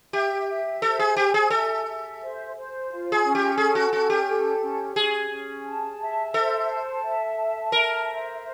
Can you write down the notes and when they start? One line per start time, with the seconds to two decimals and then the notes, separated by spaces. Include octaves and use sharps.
0.13 G4 E5
0.47 E5
0.82 A4 C5
0.99 G#4
1.16 G4 G#5
1.34 G#4
1.50 A4 E5
1.86 E5
2.20 C5
2.55 C5
2.89 F4
3.12 G#4
3.24 C#4
3.35 G4
3.58 G#4 A4
3.75 F#4
3.92 C#4 F#4
4.10 G4
4.27 A4
4.61 C#4
4.96 C#4 G#4
5.30 C#4
5.66 A5
6.00 E5
6.34 A4 C5
6.69 A5
7.03 E5
7.37 A5
7.72 A#4 E5
8.07 C5